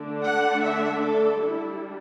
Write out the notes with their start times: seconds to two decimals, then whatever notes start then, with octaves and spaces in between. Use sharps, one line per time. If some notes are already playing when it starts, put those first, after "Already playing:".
Already playing: D3 A3 D4
0.23 F#5
0.62 E5
1.02 A4
1.40 G3 D4 E4